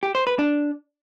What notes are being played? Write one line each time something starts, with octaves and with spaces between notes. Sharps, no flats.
G4
C5
B4
D4